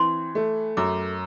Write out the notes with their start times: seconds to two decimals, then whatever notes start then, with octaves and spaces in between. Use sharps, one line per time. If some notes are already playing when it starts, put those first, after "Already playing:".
Already playing: E3 C4 C6
0.35 A3
0.77 F#2 D6